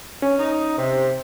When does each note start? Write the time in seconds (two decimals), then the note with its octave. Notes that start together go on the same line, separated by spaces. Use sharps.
0.22 C#4
0.39 D#4
0.77 C3